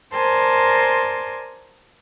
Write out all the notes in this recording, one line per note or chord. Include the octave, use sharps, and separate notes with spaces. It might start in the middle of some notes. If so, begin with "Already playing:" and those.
A#4 C5 D5 G#5 A5 C6